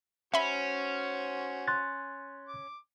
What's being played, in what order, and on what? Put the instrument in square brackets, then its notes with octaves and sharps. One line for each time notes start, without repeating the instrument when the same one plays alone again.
[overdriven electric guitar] C#4 [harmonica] F#4 C5 [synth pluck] E5 B5
[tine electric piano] C6 F#6 A6
[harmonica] D6